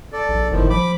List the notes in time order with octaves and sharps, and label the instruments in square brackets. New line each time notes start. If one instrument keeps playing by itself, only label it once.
[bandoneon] A4 D5
[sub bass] A#1
[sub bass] G1 [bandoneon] A2 D#3 F3
[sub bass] F3 [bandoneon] B5 D6